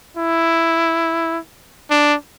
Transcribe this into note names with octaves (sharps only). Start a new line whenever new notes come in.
E4
D4